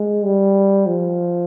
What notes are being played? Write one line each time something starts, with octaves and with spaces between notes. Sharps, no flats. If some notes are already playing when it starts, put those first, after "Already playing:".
Already playing: G#3
G3
F3